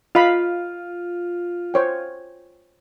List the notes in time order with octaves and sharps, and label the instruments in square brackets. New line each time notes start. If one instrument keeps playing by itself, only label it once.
[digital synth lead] F4 [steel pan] D#5 F5 B5
[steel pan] C5 C#5 G5